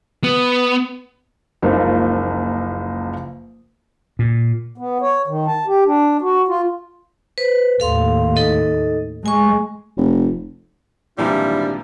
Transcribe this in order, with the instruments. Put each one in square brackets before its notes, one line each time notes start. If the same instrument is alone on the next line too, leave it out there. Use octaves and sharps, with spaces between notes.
[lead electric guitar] B3
[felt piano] F#1 C#2 F3 A#3 D#4
[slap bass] A#2
[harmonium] B3
C#5
D#3
A5
G4
D4
F#4
F4
[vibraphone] B4 C5
[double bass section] D#2 A2 [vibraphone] A4 F5 C6
[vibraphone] D#4 A4 D#5
[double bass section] G#3 [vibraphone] G#5 C#6
[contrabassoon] F1
[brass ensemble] G#1 D4 [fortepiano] A#2 E3 F3 [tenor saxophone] G3 [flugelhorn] E4